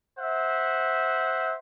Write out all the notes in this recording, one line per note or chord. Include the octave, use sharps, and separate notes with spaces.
C5 E5 F#5